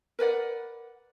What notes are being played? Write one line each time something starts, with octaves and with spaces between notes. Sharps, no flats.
A#4 B4 D5 F#5